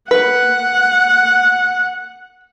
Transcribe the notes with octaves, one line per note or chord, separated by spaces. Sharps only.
B4 F#5